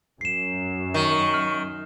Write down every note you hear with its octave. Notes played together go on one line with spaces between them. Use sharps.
F#2 C7 E7
D#3 C#6
F6